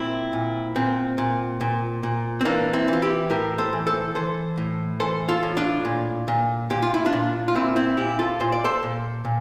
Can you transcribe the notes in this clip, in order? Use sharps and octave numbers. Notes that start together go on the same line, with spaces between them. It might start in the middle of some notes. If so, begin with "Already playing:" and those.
Already playing: A#2 C4 E4
A#2
A#2 C4
A#2
A#2
A#2
C4
E3 A#3 D4
C4 E4
E3 F4
E4 G4
A2 G4 A#4
A4 C5
E3
A4 C5
E3 A4 C5
A2
E3 A4 C5
F4 A4
A2
D4 F4
A#2
A#2
A#2 G4
F4
E4
D4 F4
A#2
F4
A#2 C4 E4
C4 E4
A#2 E4 G4
F4 A4
A#2 C5
D5
A4 C5
A#2
A#2